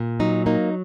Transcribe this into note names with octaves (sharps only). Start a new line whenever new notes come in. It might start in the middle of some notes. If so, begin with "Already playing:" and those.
Already playing: A#2
F#3 D#4
A#3 D#4